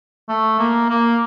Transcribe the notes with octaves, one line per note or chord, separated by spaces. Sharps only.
A3
A#3
A#3